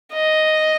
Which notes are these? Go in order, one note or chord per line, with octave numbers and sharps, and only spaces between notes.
D#5